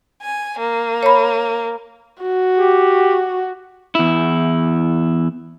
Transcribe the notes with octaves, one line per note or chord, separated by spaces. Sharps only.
G#5
A#3
C#5 B5
F#4
G4
E2 E4